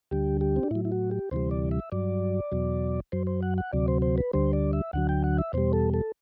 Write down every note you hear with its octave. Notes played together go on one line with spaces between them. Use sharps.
D2 D3 G3 G4
G4
C4
D4
A2 F#3 E4
E4
F#4
G4
D2 C3 E3 G3 C5
D5
E5
G2 F#3 D5
E2 B2 F#3
F#2 F#3 C5
C5
F#5
F#5
D2 C3 F#3 D5
C5
C5
B4
D2 D3 G3 C5
D5
E5
D2 D3 F#3 F#5
G5
F#5
E5
E2 B2 G3 C5
A4
A4